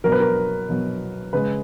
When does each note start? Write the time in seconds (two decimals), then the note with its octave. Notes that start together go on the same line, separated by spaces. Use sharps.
0.04 B2 F#3 A#4
0.12 B4
0.20 A#4
0.69 B2 F#3
1.33 C#3 G#3 B4